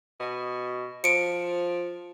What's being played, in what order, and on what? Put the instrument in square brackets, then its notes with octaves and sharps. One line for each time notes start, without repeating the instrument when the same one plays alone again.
[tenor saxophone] B2
[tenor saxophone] F3 [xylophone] C#7 D7